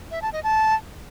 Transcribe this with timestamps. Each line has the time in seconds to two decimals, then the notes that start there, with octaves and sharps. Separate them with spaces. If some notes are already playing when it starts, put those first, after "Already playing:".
0.11 E5
0.22 A5
0.33 D#5
0.44 A5